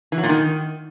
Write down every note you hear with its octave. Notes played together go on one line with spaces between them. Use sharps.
E3
F#3
A#2
D#3